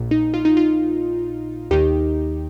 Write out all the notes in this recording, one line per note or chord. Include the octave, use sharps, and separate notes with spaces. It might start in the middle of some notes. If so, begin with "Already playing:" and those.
Already playing: A#1 A#2
D#4
F4
D#4
F4
D#2 D#3 D#4 G4